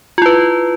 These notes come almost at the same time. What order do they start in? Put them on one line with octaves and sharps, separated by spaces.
F4 E4 B4